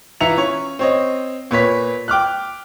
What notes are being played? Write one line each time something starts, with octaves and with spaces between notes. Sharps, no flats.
E3 F4 E5 A#5 C#7 F7
C#4 C#5
C4 C#5 D#5
A#2 B4 C#5 B6
G5 D6 F6 F#6